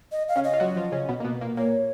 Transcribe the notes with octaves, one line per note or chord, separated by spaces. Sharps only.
D#5
F5
C#3 C#4
D#5
F4
F#3 F#4
F3 F4
C#3 C#4
B2 B3
A#3
B2 B3
A#2 A#3
A#2 A#3 C#5